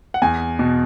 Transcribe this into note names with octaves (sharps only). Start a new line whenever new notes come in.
F#5
E2 G#5
B2